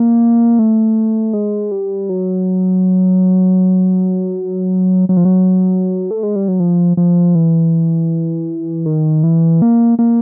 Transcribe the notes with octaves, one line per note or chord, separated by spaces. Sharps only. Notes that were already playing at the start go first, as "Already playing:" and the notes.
Already playing: A#3
A3
G#3
G3
F#3
F#3
F3
F#3
A3
G#3
G3
F#3
F3
F3
E3
D#3
E3
A#3
A#3